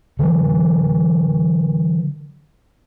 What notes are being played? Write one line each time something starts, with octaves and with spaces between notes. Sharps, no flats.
D3 E3 F#3